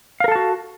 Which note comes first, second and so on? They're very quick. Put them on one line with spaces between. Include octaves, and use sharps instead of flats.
F5 A#4 A4 A5 F#4